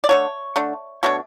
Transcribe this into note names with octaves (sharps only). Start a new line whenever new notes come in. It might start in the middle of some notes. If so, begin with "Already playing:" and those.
D5
D3 A3 D4 C#5
D3 A3 D4
B2 A3 D4 C#5